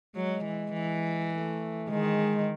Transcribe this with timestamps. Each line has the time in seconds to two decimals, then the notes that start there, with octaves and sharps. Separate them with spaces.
0.16 F#3 G#3
0.44 E3
0.73 E3
1.31 A3
1.89 D#3 G#3